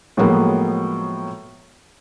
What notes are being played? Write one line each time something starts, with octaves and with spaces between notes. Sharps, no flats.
A2 F3 F#3 G#3 A#3 B3